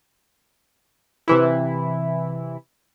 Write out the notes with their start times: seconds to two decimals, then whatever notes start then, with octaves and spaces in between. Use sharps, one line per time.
1.28 C3 E3 E4